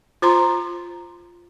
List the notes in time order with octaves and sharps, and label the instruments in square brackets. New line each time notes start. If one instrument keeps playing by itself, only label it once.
[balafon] F4 C5 A#5 C6